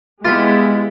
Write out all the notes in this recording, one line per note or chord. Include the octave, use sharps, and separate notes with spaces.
G#3 B3 E4 F4 G4